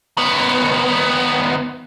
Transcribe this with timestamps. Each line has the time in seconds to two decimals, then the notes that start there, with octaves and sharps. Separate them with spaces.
0.18 D#2 B3